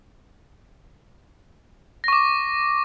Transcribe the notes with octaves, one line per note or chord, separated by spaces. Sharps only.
C#6 D6 A#6